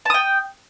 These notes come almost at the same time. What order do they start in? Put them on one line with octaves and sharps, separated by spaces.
A5 D#6 G5